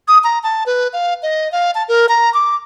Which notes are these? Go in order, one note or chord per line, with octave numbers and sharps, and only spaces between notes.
D#6
A#5
A5
B4
F5
D#5
F5
A5
A#4
A#5
D6